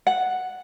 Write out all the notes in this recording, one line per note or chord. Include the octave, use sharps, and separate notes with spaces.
F#5